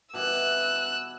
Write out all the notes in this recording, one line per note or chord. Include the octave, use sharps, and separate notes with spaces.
B2 E3 G3 E6 F#6